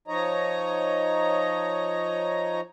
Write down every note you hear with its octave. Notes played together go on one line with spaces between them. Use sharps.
F3 D#4 C#5 D#5 A#5